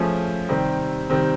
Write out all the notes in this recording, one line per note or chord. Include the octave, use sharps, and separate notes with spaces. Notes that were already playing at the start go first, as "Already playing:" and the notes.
Already playing: F3 A3 C#4 F4 G#4
C3 D#3 G3 C4
C3 D#3 G3 C4